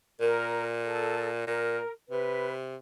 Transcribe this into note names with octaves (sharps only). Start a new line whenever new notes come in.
A#2 A#4
A4
A#2 A#4
C3 B4